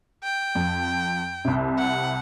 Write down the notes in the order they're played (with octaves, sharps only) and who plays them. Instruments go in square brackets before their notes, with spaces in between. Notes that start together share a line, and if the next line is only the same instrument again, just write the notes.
[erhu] G5
[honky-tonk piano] F2
C2 C3
[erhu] F#5